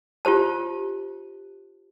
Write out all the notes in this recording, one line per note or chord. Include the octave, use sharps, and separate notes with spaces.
F4 G4 C5 A5